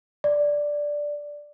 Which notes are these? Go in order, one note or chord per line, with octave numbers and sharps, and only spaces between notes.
D5